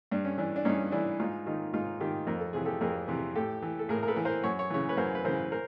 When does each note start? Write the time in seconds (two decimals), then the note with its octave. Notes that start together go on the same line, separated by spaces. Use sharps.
0.11 G2 D4
0.25 C#4
0.38 E3 D4
0.56 D4
0.65 G2 C#4 D#4
0.92 E3 D4 E4
1.19 G#2 D#4 F4
1.46 D#3 D#4 F4
1.73 G#2 D#4 F4
2.00 D#3 F4 G4
2.27 F2 A#4
2.40 A4
2.53 C3 E3 G#4
2.65 G4 A4
2.81 F2 G#4 A#4
3.08 C3 E3
3.35 A2 G4 A4
3.62 E3
3.79 A4
3.89 A2 G#4 A#4
4.03 A#4
4.08 A4 B4
4.16 E3
4.25 A#4 C5
4.43 F#2 C#5
4.59 C#5
4.70 C#3 E3 C#5
4.89 B4 C#5
4.97 F#2 A#4 C5
5.15 B4
5.24 C#3 E3 A#4 C5
5.52 A#4 C5